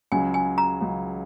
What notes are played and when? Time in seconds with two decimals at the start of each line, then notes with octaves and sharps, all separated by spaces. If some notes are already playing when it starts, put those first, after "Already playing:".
0.12 C#2 C#3 F#3 G#5
0.34 G#5
0.58 A#5
0.81 C#2 C#3 F#3